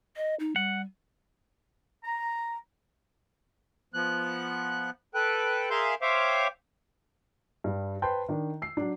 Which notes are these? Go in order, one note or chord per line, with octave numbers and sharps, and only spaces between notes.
D#5
D#4
G3 F#5
A#5
F3 B3 F#6
A4 B4 G5 F#6
G#4 A#4 E5 F5 C6 G6
C5 C#5 E5 F5 G5 D6
G2 G3
B4 C5 G5 A5 C6 G6
D#3 D4
E6 C7
F#3 D4